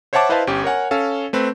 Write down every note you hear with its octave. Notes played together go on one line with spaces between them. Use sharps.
C5 C#5 E5 F#5 A5 D6
E4 B4 C5 D#5 F5 A5
G1 C#4 G4
A#4 C#5 F#5 G#5
C#4 A4 F5
A3 C4 B4